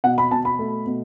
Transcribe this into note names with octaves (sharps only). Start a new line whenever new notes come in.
B2 F#5
B5
B2 A5
B5
A3
B2